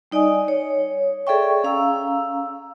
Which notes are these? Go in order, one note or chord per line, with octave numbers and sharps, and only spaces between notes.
G3 D#4 D5 D#5 G#5 D#6
C#5
G#4 A4 D5 E5 G5 C#6
C#4 F5 A#5 E6